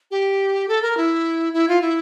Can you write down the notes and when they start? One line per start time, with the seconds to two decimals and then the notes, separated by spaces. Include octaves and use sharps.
0.11 G4
0.68 A4
0.82 A#4
0.97 E4
1.53 E4
1.68 F4
1.82 E4